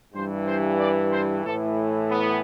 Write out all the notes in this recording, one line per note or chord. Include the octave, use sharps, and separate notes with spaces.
G2 E3 C5
C5
D5
C5
A2 E3 A4
B3